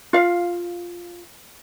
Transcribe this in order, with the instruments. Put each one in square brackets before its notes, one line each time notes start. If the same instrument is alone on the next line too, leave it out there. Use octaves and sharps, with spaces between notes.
[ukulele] F4 F5